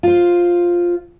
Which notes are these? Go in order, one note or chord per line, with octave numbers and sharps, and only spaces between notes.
F4 C5